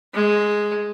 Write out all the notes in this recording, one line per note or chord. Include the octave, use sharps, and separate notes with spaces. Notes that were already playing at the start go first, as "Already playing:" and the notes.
G#3